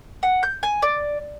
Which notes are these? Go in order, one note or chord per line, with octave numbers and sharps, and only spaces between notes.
F#5
G6
G#5
D5